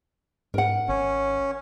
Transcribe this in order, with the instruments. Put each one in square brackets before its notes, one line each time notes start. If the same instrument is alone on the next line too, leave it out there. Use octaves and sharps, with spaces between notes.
[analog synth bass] G#2 [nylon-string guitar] A#4 F#5
[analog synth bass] G#1 [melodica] C#4